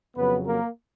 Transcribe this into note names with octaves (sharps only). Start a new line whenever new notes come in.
F2 C#3 F#3 B3 B4
A#3 A#4